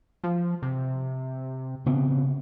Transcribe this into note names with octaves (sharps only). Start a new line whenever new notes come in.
F3
C3
C#3 B3 C4